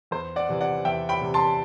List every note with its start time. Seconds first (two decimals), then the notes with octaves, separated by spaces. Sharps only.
0.11 E2 C5
0.36 D5 F#5
0.48 C3 E3
0.61 D5 F#5
0.85 E2 E5 G5
1.09 G5 B5
1.21 C3 E3
1.34 A5 C6